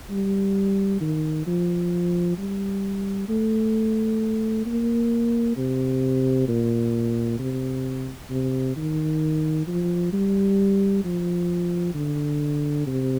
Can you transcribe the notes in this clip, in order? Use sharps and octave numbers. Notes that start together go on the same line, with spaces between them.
G3
D#3
F3
G3
A3
A#3
C3
A#2
C3
C3
D#3
F3
G3
F3
D3
C3